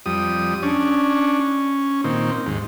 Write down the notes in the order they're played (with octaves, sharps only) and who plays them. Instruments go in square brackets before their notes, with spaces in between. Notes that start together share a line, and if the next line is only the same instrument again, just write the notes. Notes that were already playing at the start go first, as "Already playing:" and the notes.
[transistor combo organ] F2 G3 D#6
C#4 D4
C#4
A#2 D#3 C4
D#2 G#2